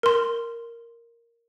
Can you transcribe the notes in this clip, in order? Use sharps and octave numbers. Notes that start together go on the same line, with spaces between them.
A#4 C6